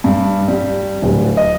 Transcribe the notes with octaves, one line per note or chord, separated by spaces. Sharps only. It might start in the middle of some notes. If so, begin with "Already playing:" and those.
G2
G3
D1
D#5